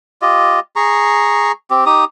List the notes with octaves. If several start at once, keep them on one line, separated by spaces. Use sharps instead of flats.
F4 G4 D#5
G#4 A#5 C#6
C4 G4
D#4 G4 D#6